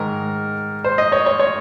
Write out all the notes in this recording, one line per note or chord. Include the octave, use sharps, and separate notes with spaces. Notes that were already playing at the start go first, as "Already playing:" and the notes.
Already playing: G#2 D#3 A#4
C5
D#5
C#5
C#5
C#5